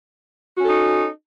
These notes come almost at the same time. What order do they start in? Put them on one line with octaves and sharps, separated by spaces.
F#4 C#4 A4 D#4